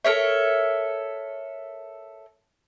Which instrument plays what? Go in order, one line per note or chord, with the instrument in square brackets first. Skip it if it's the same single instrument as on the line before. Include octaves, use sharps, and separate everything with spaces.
[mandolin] A4 A#4 C#5 E5